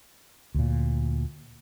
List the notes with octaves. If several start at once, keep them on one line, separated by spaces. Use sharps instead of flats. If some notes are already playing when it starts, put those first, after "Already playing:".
D2 A#2